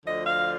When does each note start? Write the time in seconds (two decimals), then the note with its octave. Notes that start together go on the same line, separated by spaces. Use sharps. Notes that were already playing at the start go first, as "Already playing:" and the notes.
0.04 D2 D3 F3 D#5
0.26 F5